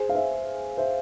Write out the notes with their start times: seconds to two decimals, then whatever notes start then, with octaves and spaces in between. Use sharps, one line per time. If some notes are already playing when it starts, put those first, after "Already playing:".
Already playing: G#4 C5
0.09 F5
0.15 C5 E5
0.77 C5 E5